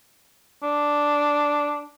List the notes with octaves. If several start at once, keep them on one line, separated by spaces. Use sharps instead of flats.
D4